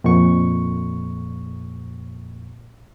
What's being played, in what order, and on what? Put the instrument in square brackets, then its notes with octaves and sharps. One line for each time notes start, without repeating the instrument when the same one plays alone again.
[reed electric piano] F2 A#2 C#6